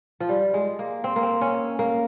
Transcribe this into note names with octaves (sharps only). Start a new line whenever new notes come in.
F3
G3
G#3
A#3
C4
A#3
C4
C#4
A#3